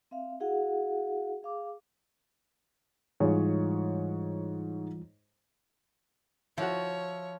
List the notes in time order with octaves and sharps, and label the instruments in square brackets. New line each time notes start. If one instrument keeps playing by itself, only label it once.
[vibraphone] C4 E5 F5
E4 F#4 G#4 F5 F#5
G#4 F5 D6
[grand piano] G#2 G#4 C#5 [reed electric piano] E3 G3 F4
[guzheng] F3 [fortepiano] E4 F#4 [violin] C#5